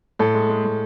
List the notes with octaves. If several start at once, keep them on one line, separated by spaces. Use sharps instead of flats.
A2 A4
G#3
G#3
A2